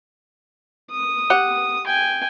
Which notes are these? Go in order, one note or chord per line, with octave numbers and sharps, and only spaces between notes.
D#6
G4 F#5
G5 G#5